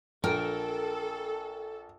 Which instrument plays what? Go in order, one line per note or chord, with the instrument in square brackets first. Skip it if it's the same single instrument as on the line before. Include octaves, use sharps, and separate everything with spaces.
[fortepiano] A#1 [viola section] A4 [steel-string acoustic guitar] A#4 G5